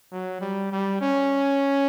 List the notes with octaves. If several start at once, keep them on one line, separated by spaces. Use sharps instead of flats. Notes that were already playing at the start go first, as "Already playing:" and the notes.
F#3
G3
G3
C#4